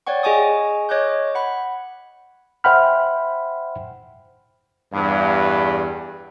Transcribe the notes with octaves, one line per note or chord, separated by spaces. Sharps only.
C#5 D5 F#5 G5 C#6
G#4 D#5 G#5 C#6 D#6
C#5 D#5 C#6 D6 F#6 G6
F#5 B5
C5 E5 F#5 G5 B5 F6
E2 G2